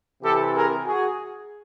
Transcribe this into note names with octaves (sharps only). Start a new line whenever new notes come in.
C3 E3 G4 A4
G#4 A#4
F#4 G#4